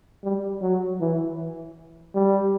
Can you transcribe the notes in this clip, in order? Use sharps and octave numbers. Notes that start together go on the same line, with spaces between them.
G3
F#3
E3
G3